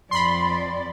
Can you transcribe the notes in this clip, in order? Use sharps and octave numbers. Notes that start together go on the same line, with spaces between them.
F2 D5 B5 C6